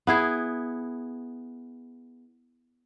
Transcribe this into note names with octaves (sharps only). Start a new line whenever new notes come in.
B3 E4 G#4